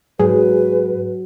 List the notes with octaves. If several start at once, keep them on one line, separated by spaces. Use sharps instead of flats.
G#2 F#3 G#4 B4